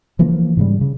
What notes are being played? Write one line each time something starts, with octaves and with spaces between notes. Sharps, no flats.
C#3 E3 F3 A#3
G#2 C#3 G3
C#3